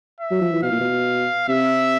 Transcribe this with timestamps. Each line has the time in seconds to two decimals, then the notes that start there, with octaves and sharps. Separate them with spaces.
0.20 E5
0.31 F#3
0.41 F3
0.52 E3
0.63 B2 F5
0.71 A#2
0.80 B2
1.48 C3 E5